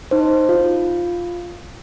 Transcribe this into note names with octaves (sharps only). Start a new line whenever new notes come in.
D#4 C5
F4